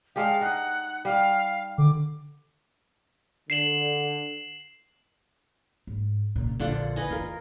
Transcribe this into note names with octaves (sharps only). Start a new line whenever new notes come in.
G#3 D4 G4 F5
D#4 F#5
G3 F5
D3 D6
D3 C7 E7 F#7
G#2
A#2 C#3
A#1 D3 F4 F#5
B4 D#5 G#5
E2 F4 A#4